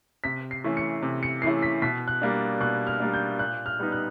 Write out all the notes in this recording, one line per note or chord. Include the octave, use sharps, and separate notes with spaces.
C3 B6
C7
E3 A3 C#4 E4
C#7
C3
C#7
E3 A3 C#4 E4 C7
B6
B2 B6
F#6
G3 A#3 D4
B2 F#6
F6
G3 A#3 D4
G6
A#2 F#6
F6
G3 B3 D#4
F#6